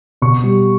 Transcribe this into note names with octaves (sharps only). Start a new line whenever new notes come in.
B2 C#6
G3